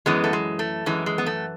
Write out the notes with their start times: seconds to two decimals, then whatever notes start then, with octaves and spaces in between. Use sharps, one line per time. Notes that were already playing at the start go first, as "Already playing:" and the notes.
0.06 F#2 E3 G#3 B3
0.24 A3
0.33 G#3
0.59 A3
0.86 F#2 E3 G#3
1.06 G#3
1.18 B3
1.26 A3